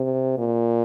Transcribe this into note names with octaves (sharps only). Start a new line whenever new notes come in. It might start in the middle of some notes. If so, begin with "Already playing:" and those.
Already playing: C3
A#2